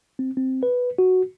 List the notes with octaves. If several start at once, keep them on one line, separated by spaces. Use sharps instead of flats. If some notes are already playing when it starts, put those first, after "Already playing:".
C4
C4
B4
F#4